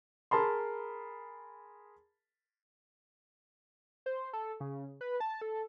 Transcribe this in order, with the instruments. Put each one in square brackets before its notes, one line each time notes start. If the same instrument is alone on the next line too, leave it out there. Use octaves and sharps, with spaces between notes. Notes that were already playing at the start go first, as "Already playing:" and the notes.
[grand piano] G#4 A#4 A5 B5 C6
[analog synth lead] C5
A4
C#3
B4
A5
A4